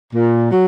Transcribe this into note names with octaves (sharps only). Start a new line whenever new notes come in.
A#2
F#3